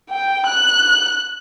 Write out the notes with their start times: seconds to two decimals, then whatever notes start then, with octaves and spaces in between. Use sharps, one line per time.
0.10 G5
0.47 F#6